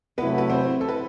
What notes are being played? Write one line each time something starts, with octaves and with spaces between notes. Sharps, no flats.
C3 F#3 A3 B3 E4 B4
B4
C4 C5
A4
B4